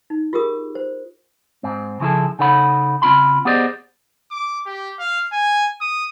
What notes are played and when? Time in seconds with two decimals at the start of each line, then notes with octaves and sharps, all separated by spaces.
0.10 D#4
0.33 F4 G4 G#4 A#4 D#6
0.75 C5
1.63 G#2 C4
2.00 C#3 F3 E4 G#4 A4
2.39 C#3 D#4 A4 C#5 F#5 B5
3.02 C#3 C4 F4 B5 C6
3.45 B3 G4 G#4 C5 D5 D#5
4.31 D6
4.66 G4
4.99 F5
5.32 G#5
5.81 D#6